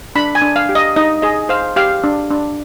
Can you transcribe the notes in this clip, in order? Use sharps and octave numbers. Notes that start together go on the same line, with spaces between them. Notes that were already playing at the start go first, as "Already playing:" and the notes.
D4 B5
G#5
D4
F5
G4
D#5
D#4 D#5
G#4 D#5
C5 F5
G4 F5
D4
D4